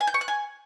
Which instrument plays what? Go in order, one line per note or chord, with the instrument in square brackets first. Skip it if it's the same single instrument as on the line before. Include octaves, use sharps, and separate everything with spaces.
[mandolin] G#5
G6
C#6
F#6
G#5